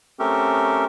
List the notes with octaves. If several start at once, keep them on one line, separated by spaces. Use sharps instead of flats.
A3 C4 C#4 G4 A4 A#4